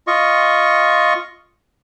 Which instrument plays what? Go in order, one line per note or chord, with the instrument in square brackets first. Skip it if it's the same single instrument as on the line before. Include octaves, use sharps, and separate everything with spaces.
[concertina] F4 D#5 C#6